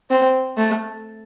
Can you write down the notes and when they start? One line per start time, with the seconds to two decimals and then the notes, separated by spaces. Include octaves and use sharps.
0.10 C4
0.57 A3